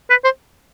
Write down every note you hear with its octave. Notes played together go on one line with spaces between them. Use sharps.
B4
C5